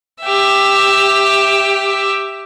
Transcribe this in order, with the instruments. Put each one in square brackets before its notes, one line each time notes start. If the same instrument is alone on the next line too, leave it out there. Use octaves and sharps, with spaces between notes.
[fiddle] G4 E5